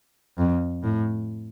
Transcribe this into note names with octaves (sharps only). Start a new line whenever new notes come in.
F2
A2